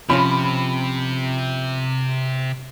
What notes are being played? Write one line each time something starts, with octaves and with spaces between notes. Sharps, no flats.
C3 F3 C#4 F4 B5